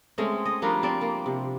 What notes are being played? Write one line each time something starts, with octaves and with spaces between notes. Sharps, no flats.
G#3 A3 C4 C#4
D#5
F3 G3 D4 A#4
C4 D5
A#3
C3